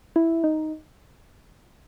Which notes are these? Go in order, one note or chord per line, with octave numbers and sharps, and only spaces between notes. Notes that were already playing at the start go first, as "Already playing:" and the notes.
E4
D#4